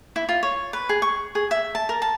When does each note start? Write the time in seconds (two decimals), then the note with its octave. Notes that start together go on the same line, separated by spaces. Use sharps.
0.16 E4
0.29 F4
0.43 C#5
0.73 B4
0.89 G#4
1.02 C#6
1.35 G#4
1.51 E5
1.75 A5
1.89 A#4
2.02 A5